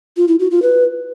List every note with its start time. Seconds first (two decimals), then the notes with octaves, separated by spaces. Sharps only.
0.17 F4
0.28 E4
0.40 F#4
0.51 F4
0.62 B4